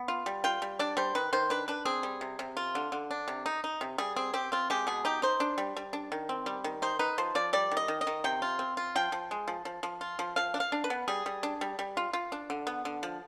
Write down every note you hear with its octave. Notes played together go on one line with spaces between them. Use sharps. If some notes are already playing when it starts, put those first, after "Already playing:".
Already playing: B3
F4
G3
F4 G5
G3
D4 D5
G3 C5
D#3 B4
D#3 C5
D4 B4
D4 B4
C4 G#4
G3
C3
C3
F4
D3
D3
D4
C3
D#4
D#4
C3
G3 G#4
C4 G#4
C4 G4
C4 F4
G#3 G4
B2 G#4
D#4 G4
D#4 C5
D4
G3
G3
D4
D#3
C4
G3
D#3
D#4 C5
D#4 B4
F3 C5
F3 D5
G3 D5
D#3
D#5
D#3
D#5
D#3
C3 G5
F4
C4
F4
F3 G5
F3
G#3
F3
F3
F3
F4
F3
F3 F5
D4
F5
D4
B4
B3
G3 G#4
G3
D4
G3
G3
F4
F4
D4
D3
B3
D3
F3